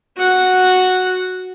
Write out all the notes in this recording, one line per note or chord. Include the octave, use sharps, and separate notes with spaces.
F#4 F#5